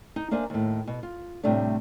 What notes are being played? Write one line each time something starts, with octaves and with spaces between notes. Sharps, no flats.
D#4
A#3 D4 C5 E5 G#5
D#2 A2
B2
F4
A2 C3 G3 A3 D4